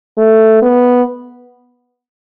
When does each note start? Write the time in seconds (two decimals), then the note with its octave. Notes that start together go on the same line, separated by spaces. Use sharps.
0.18 A3
0.62 B3